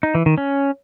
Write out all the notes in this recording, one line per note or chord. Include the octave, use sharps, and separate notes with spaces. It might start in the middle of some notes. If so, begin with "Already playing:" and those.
D#4
E3
D#3
C#4